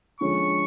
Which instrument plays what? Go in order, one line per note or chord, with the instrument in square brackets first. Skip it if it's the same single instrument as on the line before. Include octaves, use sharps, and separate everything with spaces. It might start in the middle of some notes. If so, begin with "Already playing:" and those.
[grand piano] D3 F3 G#3 C#4 [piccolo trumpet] C#6